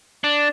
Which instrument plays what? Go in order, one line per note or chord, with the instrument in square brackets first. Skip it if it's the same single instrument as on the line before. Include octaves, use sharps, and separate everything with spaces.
[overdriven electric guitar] D4